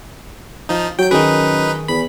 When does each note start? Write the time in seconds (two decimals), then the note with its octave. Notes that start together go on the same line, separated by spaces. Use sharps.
0.69 F3 D#4
0.99 F#3 G5 G6
1.11 F#2 D#3 D#4 G#4 B4
1.88 E2 B5